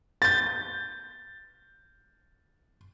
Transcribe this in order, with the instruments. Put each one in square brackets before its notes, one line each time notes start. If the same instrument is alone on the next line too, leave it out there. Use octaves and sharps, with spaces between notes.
[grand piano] G6 A6